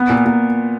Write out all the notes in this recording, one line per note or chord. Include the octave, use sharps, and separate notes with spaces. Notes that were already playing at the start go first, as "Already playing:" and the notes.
Already playing: B3
A#2
A#2